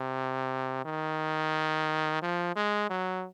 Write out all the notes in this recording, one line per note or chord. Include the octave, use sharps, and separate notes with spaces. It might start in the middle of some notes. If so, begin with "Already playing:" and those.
Already playing: C3
D#3
F3
G#3
F#3